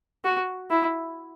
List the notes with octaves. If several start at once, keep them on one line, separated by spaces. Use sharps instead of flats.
F#4
E4